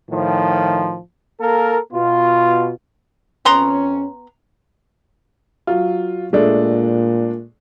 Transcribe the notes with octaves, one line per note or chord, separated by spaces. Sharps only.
A2 D#3 F3
A#3 A4 A#4
B2 F4
F2 B3 C#4 A#5 C6
F#3 F4
A#2 G#3 A3 D4